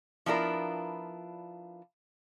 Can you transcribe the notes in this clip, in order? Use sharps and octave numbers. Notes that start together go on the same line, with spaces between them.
F3 B3 D4 E4 F4 A#4